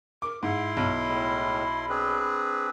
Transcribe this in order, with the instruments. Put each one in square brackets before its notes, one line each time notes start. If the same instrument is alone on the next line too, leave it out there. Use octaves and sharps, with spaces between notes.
[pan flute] A#4 [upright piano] D6
[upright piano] G#2 [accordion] E4 C6 [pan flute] F#5
[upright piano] B1 [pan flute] B5
[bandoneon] A2 G#3
[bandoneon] C4 D4 B4 [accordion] G#4